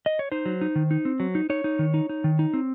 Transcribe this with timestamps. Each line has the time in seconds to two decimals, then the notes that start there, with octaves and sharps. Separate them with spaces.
0.06 D#5
0.19 C#5
0.32 D#4 C5
0.46 F#3
0.61 D#4
0.75 D#3
0.91 D#4
1.05 C4
1.20 F#3
1.35 D#4
1.50 D#4 C#5
1.64 D#4
1.79 D#3
1.94 D#4
2.09 D#4
2.24 D#3
2.39 D#4
2.54 C4